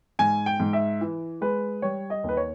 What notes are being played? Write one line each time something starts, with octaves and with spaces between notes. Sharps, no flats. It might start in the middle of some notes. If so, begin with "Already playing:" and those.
G#2 G#5
G5
G#2
E5
E3
G#3 B4
G3 C#5
D#5
D#2
B4
C#5